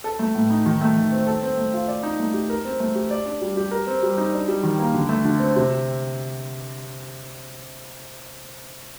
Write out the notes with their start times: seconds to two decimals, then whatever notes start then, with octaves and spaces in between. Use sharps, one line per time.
0.04 A4
0.19 A3
0.35 A2
0.50 D#4
0.66 D#3
0.81 A3
0.96 D#3
1.12 C4
1.26 A4
1.42 C4
1.57 A3
1.73 F4
1.88 D5
2.03 D#4
2.19 A3
2.34 G4
2.50 A#4
2.65 C4
2.80 A3
2.95 G4
3.11 D5
3.26 D4
3.41 G3
3.57 G4
3.71 A#4
3.87 C4
4.03 G3
4.18 D#4
4.34 D4
4.48 G3
4.63 D#3
4.79 A#3
4.94 D3
5.09 A3
5.25 D3
5.40 C4
5.56 C3